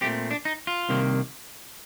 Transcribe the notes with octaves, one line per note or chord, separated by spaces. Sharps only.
A#2 A3 C4 G4
D4
D#4
F4
C2 C3 D#3 A#3